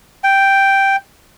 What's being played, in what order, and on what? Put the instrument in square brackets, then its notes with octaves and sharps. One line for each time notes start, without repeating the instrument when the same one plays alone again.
[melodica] G5